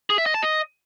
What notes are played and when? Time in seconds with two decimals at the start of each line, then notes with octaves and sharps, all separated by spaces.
0.10 G#4
0.18 E5
0.26 D#5
0.34 A5
0.43 D#5